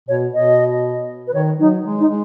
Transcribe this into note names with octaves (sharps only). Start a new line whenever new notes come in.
B2 C#5
B2 D#5
B4
D#3 C#5
F#3 D#4
G#3
D#4
G#3